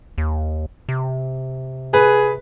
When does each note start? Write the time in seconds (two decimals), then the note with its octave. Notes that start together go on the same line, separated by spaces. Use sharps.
0.18 D#2
0.89 C3
1.94 G#4 B4